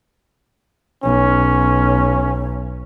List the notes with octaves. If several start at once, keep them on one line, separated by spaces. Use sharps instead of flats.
B1 C#4